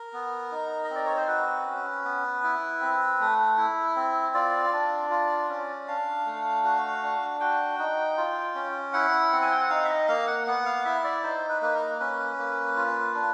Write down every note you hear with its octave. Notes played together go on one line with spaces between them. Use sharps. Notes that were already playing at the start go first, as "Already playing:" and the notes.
Already playing: A#4
B3
D#4
D#5
C4 D5
C#5
C5
F#4 B4
C#4
B3
E4
C4
A3
E4
C4
F4 D5
D4
F4
C#4
D4 F5
A3
F#4
D4
F#4 G5
D#4
F4
C#4
E4 F#5
C4
G#5
G5
F#5
D#4 F5
E5
D#5
A#3 F5
F#5
B3 F#5
F5
E4 E5
D5
D#4 C5
B4
A#3 B4
A#4
C#4 B4
A#3
F4
D4